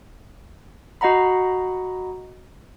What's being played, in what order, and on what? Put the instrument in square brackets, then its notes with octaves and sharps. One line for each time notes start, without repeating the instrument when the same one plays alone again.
[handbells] F#4 D#5 F#5 A#5 B5